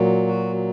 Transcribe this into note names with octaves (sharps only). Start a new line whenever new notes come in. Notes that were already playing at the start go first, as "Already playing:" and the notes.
Already playing: A#2 F#3
F#4